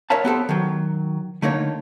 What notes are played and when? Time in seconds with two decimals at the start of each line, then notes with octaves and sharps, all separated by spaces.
0.10 A#4 C#5 E5 F5 A5
0.25 B3 G4 A4 C5
0.49 D#3 F#3
1.42 D3 A3 A#3 D#4 C#5